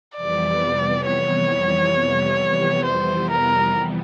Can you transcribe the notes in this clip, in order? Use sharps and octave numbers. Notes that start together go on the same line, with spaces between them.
F2 C3 E3 G3 B3 D5
C#5
C5
A#4